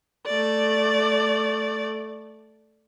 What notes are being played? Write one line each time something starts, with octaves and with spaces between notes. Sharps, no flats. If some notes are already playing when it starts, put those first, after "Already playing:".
A3 D5